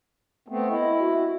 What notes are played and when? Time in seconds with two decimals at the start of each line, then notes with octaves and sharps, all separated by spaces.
0.48 A3 B3 C4
0.69 E4 D#5
0.99 F#4